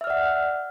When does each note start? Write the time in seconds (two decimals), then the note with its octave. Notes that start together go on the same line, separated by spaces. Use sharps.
0.01 E5
0.04 F6
0.07 D5
0.10 F#5